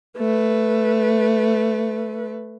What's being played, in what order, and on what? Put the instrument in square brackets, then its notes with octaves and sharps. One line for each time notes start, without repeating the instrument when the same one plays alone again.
[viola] A3 B4